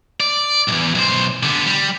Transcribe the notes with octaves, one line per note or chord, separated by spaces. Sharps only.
D5
B1 E2
B1 C5
D3 B3
G3